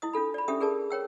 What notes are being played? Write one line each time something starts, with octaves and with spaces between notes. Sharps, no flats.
E4 D#5 D#6
D4 F4 A4 B5
D5 B5
C#4 D4 G4 A4 E5 D#6
G#4 A#4 D5 A5
A#4 C#5 G5 E6